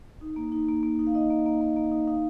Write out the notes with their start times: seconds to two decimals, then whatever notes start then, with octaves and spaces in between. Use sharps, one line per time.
0.21 D#4
0.36 A#3
0.52 D#4
0.69 A#3
0.83 A#3
0.99 D#4
1.07 F5
1.15 D#4 D#5
1.30 A#3
1.46 A#3
1.61 A#3
1.77 A#3
1.92 D#4
2.07 D#4 F5